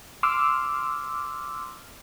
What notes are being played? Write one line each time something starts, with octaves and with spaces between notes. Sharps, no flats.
C6 D6 E6 F6